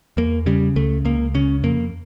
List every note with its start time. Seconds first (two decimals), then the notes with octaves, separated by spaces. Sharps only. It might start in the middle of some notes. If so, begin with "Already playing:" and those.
0.17 E2 A#3
0.46 C#3 G3
0.76 C#2 A3
1.05 C#2 A#3
1.34 C#3 C#4
1.63 F2 A#3